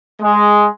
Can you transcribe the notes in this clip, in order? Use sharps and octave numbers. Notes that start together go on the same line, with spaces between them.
G#3